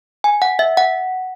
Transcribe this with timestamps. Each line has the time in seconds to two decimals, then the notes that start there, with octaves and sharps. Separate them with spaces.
0.24 G#5
0.42 F#5
0.59 E5
0.77 F#5